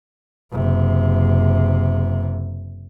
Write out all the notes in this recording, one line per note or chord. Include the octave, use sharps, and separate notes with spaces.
F#1 C3